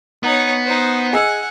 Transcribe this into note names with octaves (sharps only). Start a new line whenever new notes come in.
B3 D#4 C#5
D#4 C5
G#4 D#5 F#5 G#5 E6